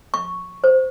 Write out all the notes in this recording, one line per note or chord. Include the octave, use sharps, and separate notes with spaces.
C#6
C5